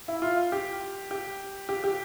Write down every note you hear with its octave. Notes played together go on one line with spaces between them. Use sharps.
E4
F4
G4
G4
G4
G4